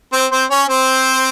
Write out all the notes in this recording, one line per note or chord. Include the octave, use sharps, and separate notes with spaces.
C4 C5
C4 C5
C#4 C#5
C4 C5